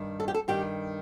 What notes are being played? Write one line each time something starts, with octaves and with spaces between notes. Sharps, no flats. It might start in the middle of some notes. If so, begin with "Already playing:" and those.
Already playing: G2 D#3
A4
G4
A4
G2 D#3 G4